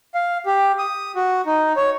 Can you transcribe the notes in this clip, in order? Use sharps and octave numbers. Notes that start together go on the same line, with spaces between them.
F5
G4
D#6
F#4
D#4
C#5